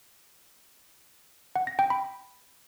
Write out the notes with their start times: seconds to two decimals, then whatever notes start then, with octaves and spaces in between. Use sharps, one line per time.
1.56 F#5
1.67 A#6
1.79 G5
1.90 B5